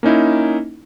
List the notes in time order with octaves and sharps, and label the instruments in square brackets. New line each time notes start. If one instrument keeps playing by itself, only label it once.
[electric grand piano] A#3 C#4 D#4 E4